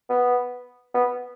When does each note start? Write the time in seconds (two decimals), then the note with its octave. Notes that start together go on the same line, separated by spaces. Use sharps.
0.10 B3
0.94 B3